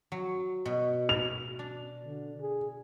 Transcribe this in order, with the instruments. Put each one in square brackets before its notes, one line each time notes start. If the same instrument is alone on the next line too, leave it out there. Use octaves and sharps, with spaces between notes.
[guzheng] F#3
B2
[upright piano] F7
[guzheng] D4
[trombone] D3
G#4